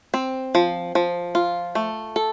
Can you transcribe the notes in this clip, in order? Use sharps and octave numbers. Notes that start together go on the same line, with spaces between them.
C4
F3
F3
F4
A3
A4